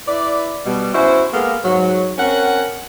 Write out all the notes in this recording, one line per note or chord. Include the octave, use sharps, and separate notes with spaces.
E4 B4 D5
B2 G3
C#4 E4 F#4 C5
G#3 A#3 B3 A4 F5
G#2 F#3
C4 C#4 A#4 F#5